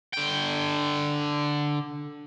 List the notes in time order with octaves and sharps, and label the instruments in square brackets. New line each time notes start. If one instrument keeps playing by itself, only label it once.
[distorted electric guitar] D3 G5